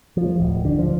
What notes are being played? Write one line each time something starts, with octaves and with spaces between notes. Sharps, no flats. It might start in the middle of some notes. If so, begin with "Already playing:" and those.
F3
D1
D3
F3